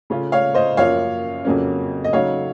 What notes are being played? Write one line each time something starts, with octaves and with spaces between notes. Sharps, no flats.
C#3 A3 C#4 F4
C#5 F5
C5 D#5
F#2 F3 A#3 F4 C#5 F5
F2 C#3 F#3 A#3 C#4
D#5
C#3 F#3 A3 D#4 C#5 F5